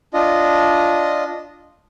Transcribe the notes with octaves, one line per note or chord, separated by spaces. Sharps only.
D4 F4 D#5